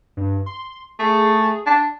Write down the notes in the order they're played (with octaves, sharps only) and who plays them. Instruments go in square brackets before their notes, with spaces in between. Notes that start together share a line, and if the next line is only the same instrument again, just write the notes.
[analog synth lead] G2
C6
[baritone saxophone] A3 [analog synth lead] G#4
[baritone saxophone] D4